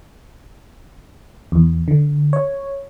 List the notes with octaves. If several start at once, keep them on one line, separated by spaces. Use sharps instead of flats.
E2
D3
C#5